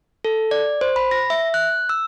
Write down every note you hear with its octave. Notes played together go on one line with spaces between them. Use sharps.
A4
D5
C5
B5
A#6
E5
F#6
E6